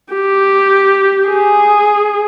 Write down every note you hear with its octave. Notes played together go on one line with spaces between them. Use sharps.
G4
G#4